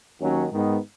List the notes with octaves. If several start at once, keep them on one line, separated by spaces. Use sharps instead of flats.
D#2 D#3 F#3 C#4
G#2 D#3 B3 D#4